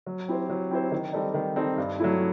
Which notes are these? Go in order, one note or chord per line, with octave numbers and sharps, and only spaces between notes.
F#3
C4 E4 G4 C5
F#3
C4 E4 G4 C5
D#3
G3 C4 D#4 A4
D#3
G3 C4 D#4 A4
G2
F#3 A3 E4